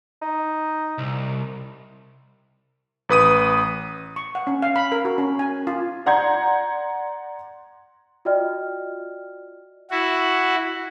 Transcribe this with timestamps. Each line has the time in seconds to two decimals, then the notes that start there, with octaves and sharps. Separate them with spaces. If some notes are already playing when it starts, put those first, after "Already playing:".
0.22 D#4
0.98 C2
3.09 A1 B4 D#6 D#7
4.16 C#6
4.35 F#5
4.47 C#4
4.62 F5
4.76 B5
4.92 A#4
5.05 F#4
5.18 C#4
5.39 G#5
5.67 F4
6.06 D5 F#5 A#5 C6 G6 G#6
8.25 F4 F#4 D5 D#5 G5 F6
9.91 E4 F#4